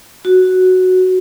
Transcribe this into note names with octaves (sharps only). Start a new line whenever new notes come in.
F#4